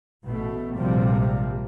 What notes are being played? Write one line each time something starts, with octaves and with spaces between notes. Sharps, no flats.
A1 B2 A3
A#1 G#2 C3 F3 G3 A#3